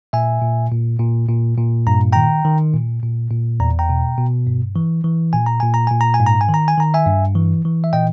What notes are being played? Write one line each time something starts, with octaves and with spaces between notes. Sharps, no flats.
A#2 E5 G#5
A#2
A#2
A#2
A#2
A#2
G2 A#5
D#3 G5 A#5
D#3
A#2
A#2
A#2
E2 A#5
G5 A#5
B2
B2
G2
E3
E3
A#2 G#5
A#5
A#2 G#5
A#5
A#2 G#5
A#5
G#5
G#2
A#5
G#5
D#3
A#5
G#5
D#3 A#5
E5 G#5
G2
E3
E3
E5
A#2 D#5 G5